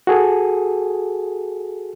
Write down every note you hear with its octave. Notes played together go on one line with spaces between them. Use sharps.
F#4 G#4 A4